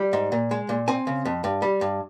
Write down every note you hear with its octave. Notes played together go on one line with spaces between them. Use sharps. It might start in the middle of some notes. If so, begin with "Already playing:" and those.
Already playing: G3
G#2
A#2
G#3
A#2
C4 G#5
C#3
F2
G2
G3
G2